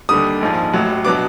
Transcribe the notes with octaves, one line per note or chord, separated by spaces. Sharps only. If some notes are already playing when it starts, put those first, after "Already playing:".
D#2 D3 G3 D#6
A#1 G#2 F3
A1 A2 F#3
B2 F#3 B3 D4 D6